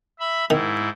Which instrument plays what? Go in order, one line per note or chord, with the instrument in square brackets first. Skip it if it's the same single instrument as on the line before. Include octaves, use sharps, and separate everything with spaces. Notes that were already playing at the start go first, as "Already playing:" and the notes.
[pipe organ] E5 B5
[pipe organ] G#2 E4 [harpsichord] D#3